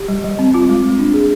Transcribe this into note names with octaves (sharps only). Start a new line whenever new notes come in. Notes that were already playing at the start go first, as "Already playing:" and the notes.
Already playing: G4
G3
G3
C4
F4
G#3
G#3
D4
G#4